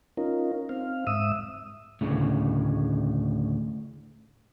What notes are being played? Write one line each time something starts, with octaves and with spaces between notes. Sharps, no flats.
C#4 D#4 F4 A#4
C4 F5
G#2 E5 D#6 E6
D2 A2 C#3